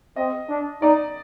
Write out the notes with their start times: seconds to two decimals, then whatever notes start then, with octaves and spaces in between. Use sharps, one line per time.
0.16 C4 D#5
0.49 D4
0.82 D#4 D5